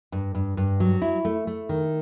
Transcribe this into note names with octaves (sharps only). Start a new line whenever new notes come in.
G2
G2
G2
F#3
E4
A3
A3
D#3